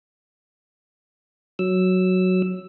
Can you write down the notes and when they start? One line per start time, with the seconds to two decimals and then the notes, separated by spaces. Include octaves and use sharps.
1.59 F#3 E6